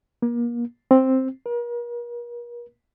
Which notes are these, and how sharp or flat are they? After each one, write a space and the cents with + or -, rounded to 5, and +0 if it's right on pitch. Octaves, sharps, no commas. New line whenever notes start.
A#3 +35
C4 +5
A#4 +40